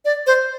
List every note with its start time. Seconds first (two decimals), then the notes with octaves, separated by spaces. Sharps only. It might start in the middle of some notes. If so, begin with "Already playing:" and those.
0.05 D5
0.27 C5